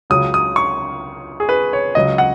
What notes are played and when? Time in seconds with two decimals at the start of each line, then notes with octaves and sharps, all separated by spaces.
0.10 C#2 C#3 F#3 D#6
0.34 D#6
0.56 C#6
1.40 G#4
1.49 B4
1.73 C#5
1.95 C#2 C#3 F#3 D#5
2.18 F#5